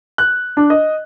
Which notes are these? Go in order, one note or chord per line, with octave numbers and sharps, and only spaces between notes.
F#6
D4
D#5